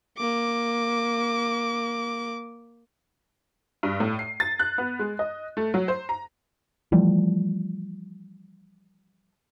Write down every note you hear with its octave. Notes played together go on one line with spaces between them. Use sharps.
A#3 D6
G2
A2
C7
A6
F#6
B3
G#3
D#5
A3
F#3
C5
A#5
E3 F3 G3 A3